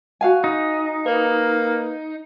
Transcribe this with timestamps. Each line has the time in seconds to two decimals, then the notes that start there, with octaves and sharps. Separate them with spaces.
0.21 F#4 F5 G#5
0.44 D#4
1.06 A#3 B4